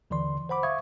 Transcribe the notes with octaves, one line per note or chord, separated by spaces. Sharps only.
D#2 D3 E3 D5 C6
C5 F#5 B5 D6
E5 F5 C#6 D#6 G#6